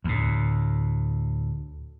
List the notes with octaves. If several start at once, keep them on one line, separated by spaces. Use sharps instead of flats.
D2 A2